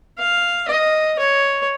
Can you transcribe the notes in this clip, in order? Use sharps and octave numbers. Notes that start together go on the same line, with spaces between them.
F5
D#5
C#5